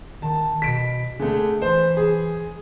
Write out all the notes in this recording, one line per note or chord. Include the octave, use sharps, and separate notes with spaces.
D#3 A5
B2 B6 D7
D3 A3 G#4
E3 C5
G#4